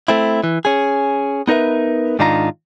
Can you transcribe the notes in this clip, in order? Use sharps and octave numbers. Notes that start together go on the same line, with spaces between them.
A3 C4 E4
E3
C#4 G#4
B3 D#4 A#4 B4 E5
G#2 D#3 D4 D#4 F4 A#5